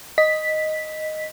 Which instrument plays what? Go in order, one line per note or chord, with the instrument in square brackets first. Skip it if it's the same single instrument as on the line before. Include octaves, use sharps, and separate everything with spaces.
[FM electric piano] D#5 B6